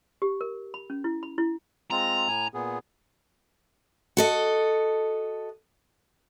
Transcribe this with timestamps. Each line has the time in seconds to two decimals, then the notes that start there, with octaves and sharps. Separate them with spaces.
0.22 G4
0.41 A#4
0.74 B5
0.90 C#4
1.04 E4
1.23 B5
1.38 E4
1.91 G#3 C4 F4 A#5
2.28 A2 G#5
2.54 A#2 B3 G#4
4.17 F#4 A4 D#5